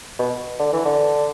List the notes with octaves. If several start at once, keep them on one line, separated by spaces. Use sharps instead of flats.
B2
D3
E3
D3